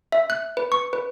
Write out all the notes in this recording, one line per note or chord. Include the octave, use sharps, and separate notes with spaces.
E5
F#6
B4
C#6
B4